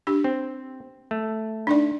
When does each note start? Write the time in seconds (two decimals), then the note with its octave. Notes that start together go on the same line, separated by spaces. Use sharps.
0.07 D4 G4
0.24 C4
1.11 A3
1.67 D4 D#4 D5